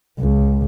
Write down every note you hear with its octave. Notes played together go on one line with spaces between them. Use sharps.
C#2